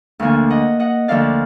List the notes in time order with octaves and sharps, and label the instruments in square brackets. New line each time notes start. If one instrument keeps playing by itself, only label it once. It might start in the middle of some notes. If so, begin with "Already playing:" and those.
[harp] D2 D3 F3 A#3 F5 G#5
D#5 F#5
D#5 F#5
D2 D3 F3 A#3 D5 F5